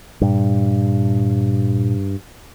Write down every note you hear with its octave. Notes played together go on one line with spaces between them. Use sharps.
G2 A#2